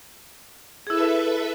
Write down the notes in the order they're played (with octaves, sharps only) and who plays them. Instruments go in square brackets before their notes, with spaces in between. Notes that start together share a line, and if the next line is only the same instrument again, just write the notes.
[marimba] E4 G#4 [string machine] A4 B4 E5